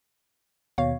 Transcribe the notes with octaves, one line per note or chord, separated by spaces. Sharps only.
D#2 B2 C#5 F5